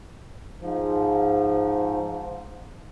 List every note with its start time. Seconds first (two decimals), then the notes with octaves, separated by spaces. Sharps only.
0.61 G#2 F3